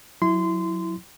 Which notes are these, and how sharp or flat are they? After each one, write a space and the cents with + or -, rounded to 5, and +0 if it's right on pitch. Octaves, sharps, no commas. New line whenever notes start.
F#3 -20 E4 +0 C6 -20